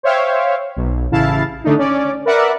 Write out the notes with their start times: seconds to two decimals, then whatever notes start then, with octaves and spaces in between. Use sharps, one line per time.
0.03 C5 C#5 E5 F5 G5
0.76 B1
1.11 A1 C#3 E4 F5 A5
1.64 D3 A3 D4 D#4
1.78 C#4 D5
2.25 A#4 B4 D5 E5 F#5